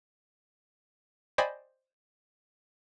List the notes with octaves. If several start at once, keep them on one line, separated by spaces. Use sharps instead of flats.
C5 D5 D#5 G5 G#5 B5